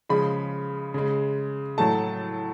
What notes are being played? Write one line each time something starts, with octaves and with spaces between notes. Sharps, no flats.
C#3 F3 G#3 B5
C#3 G#3
A2 F#3 A3 A5